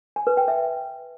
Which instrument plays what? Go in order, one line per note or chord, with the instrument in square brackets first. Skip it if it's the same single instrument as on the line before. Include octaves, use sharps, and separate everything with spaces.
[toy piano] G#5
B4
G5
E5